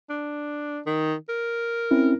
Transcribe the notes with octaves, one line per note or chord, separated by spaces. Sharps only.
D4
D#3
A#4
C4 C#4 E4